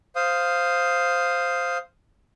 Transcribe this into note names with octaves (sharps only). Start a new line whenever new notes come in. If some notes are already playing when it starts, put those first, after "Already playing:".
C5 F5 D#6